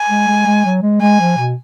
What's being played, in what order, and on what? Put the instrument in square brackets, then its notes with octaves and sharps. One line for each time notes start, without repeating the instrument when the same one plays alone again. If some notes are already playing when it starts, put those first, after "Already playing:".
Already playing: [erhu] G#5
[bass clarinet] G#3
G#3
G#3
F#3
G#3
[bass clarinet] G#3 [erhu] G#5
[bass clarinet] F3
B2